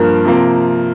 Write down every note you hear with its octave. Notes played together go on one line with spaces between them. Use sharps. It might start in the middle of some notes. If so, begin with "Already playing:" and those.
Already playing: G2 F3 A#3 A#4
C3 F3 A#3